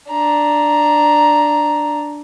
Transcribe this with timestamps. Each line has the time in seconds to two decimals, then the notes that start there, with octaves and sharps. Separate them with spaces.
0.11 D4 A#5